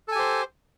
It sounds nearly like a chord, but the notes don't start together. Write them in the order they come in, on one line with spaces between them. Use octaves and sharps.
A4 G#5 G4 C5